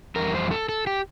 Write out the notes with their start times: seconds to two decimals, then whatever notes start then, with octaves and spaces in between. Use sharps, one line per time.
0.16 F2 E3 G3 A#4
0.34 C5
0.51 A4
0.69 A4
0.87 G4